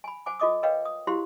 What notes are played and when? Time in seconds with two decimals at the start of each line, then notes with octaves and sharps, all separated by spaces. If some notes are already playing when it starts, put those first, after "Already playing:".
0.04 G#5 B5
0.26 C5 F#5 G#5 D6
0.40 F4 A4 D#5 D6 D#6
0.63 A#4 B4 C#5 D#5 F5 G5
0.85 D#6
1.07 E4 F#4 G4 C5 F5 C6